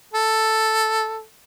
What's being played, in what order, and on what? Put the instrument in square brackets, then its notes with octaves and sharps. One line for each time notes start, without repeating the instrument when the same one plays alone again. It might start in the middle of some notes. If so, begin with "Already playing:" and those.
[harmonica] A4